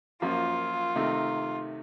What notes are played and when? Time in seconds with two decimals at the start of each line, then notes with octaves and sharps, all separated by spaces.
0.22 F#2 F3 A#3 F4
0.96 C3 D#3 A3 D#4